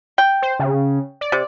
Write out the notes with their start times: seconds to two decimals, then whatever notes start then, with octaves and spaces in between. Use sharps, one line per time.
0.18 G5
0.42 C5
0.60 C#3
1.21 D5
1.32 C3